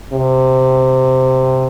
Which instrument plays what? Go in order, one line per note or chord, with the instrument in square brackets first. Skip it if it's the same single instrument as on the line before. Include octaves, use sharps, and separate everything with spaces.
[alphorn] C3